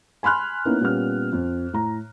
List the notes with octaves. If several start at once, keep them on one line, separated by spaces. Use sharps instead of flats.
G#5 B5 C6 F6 F#6
A#3 B3 C#4 D#4 E4
A#2 G3 B3 C#4 F6
F2
A2 A#5